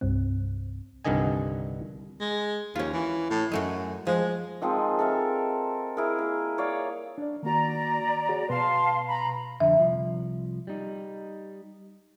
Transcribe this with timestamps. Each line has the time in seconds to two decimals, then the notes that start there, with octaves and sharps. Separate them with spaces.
0.01 C2 G2 C3 C4
1.05 C2 G2 D3 D#3 D#5 G#5
2.21 G#3
2.75 D#2 C#4 F4
2.93 E3
3.30 A2
3.52 F#2 G#3 A3 F#4
4.07 F3 G#3
4.62 D#3 F3 G#3 C4
4.99 A4 A#4 E5
5.97 E4 G#4 A#4
6.19 A#3 A#4
6.58 C#5 D5 F5
7.18 D4 D5
7.43 D#3 A#3 F#4 D5 A#5
8.29 F#4 G#4 C#5
8.49 B2 B4 F5 A5 C6
9.07 A#5 B5
9.60 F2 D3 E5
9.80 C2 F3
10.67 G3 D#4